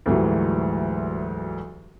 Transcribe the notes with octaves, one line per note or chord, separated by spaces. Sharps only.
D2 G#2 E3 F#3 G3